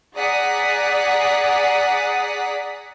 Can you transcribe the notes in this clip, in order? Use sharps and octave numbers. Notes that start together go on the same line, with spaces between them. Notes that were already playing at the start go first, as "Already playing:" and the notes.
G#4 D5 F#5 A#5 D#6 B6